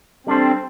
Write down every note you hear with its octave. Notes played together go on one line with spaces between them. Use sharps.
G3 C4 D4 A4 C5